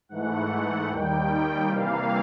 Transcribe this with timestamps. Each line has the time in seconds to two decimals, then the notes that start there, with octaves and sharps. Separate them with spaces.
0.09 G#2 E3 A3 F#5
0.49 F#5
0.89 D#2 D#3 G3 G5
1.69 C3 E3 G3 A#3 F5